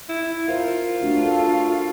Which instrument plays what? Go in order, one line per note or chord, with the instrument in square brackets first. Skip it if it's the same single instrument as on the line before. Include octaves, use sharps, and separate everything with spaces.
[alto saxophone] E4
[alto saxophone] F4 [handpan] A#4 C5
[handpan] A3 D4 F#4
A4